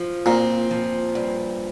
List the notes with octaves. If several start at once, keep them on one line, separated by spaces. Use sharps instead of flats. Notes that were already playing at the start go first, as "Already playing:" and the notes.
Already playing: F3
A#2 C4
F3
G2